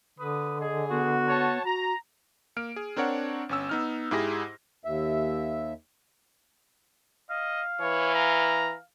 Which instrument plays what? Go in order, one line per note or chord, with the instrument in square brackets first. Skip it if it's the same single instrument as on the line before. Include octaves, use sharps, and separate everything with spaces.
[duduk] D3 [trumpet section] B4 D#6
[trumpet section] G#4 [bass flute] D#5
[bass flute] B3 [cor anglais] F#4
[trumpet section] C#5 A5
[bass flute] F#4 [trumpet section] A#5
[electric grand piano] A#3 F6 D7
G#4
C4 D4 A#4 C#5 F#5
G1 C#4 E6
B3 D#4 F6
G#2 E4 G4 G#4 A#6
[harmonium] D#2 E5
[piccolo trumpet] D#5 [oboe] F5
[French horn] E3 [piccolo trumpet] C#5
[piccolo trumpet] A#5